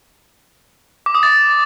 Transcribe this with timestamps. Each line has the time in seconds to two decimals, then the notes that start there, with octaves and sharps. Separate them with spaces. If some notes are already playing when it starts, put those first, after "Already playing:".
1.06 D6
1.15 D#6
1.23 A6